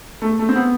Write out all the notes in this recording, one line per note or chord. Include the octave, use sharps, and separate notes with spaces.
A3
A3
C4
B3